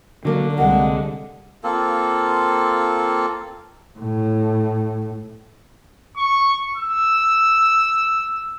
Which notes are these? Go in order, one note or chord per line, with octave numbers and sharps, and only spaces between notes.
D3 F#3 A#3 D4
C2 G3 G#3 A#3 F#5
A#3 C4 F4 A4
A2
C#6
E6